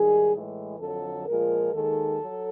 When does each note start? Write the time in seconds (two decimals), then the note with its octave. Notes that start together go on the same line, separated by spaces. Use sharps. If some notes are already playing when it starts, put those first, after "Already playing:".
Already playing: G#2 D#3 G3 G#4
0.33 A2 E3 G#3
0.80 F2 D3 F#3 A4
1.27 A#2 F3 G#3 A#4
1.73 D#2 D#3 G#3 A4
2.21 F#3